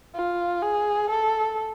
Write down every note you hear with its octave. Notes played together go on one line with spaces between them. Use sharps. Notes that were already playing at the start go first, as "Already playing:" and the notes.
F4
G#4
A4